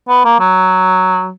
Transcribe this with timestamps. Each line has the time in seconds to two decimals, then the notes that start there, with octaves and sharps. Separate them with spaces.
0.08 B3
0.25 A#3
0.40 F#3